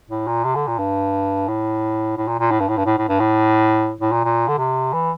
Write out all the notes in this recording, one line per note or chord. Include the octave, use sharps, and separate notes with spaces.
A2
A#2
C3
D3
A#2
G2
A2
A2
A#2
A#2
A2
G2
A2
G2
A2
A2
G2
A2
A2
A#2
A#2
D3
C3
E3